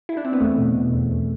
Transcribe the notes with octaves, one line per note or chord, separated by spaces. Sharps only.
E4
D4
C4
B3
E2 A3
B2
B2
E2
E2